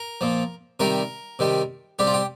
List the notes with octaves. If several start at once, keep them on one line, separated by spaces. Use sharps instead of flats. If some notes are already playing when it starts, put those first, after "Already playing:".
Already playing: A#4
A#2 F3
C3 D#3 G3 A#4
C3 D#3 G3
C3 G3 G4
F4
G4